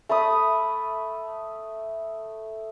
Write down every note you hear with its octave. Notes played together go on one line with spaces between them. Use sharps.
A3 A5 B5 D#6